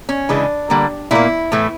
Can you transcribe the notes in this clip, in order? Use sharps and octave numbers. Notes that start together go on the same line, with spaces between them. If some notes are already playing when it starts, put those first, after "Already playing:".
C#4
C#3 E3 G#3 D4
D3 G3 A#3
A#2 G3 A#3 E4
A2 E3 A3